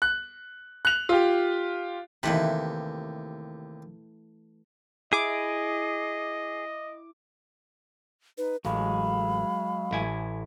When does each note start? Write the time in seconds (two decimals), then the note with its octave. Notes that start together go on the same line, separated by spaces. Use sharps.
0.02 F#6
0.85 F#6 F7
1.09 F4 G4
2.23 D#2 C3 E3 A3 B4
5.13 E4 G#4 D#5 D6
8.38 D#4 B4
8.65 A1 F#3 G#3 F5 B5
9.91 A1 E4 G#5